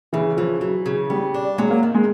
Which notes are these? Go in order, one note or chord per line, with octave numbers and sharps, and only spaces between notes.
C#3 E3
E3 F3
E3 F#3
C#3
G3 B3
D4
F#3 G#3
A#3
D#3 A#3
G#3